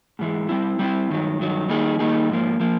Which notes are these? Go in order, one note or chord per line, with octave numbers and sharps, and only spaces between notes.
G#2 E3 G#3
G3 C4 E4
G3 C4 E4
G2 D#3 F#3
G2 D#3 F#3
D#3 G3 A#3 D#4 G#4
D#3 G3 A#3 D#4 G#4
G#2 F3 A#3
F3 A#3